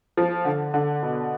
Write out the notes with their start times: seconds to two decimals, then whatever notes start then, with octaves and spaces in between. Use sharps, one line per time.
0.17 F3
0.45 D3
0.74 D3
1.03 B2